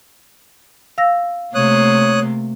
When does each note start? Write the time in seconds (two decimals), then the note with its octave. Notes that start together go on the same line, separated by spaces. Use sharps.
0.98 F5 E6 A#6
1.55 C3 A3 A#3 C#5 D#6 F#6